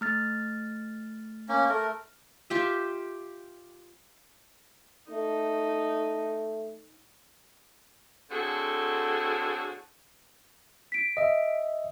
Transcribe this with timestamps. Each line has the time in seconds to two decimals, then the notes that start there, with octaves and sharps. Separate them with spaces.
0.01 A3 F6 A6
1.49 A#3 C#4
1.69 A3 A#4
2.50 F4 G4 E5
5.11 A3 D#4
8.30 A2 D3 C4 F#4 G#4 A4
10.92 B6 D7
11.17 D#5 E5